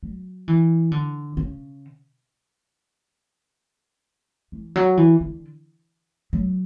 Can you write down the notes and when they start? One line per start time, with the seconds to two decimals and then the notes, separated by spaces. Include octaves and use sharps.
0.03 F#3
0.48 E3
0.92 D3
1.37 C#3
4.52 E3
4.76 F#3
4.97 E3
5.21 D3
6.33 F#3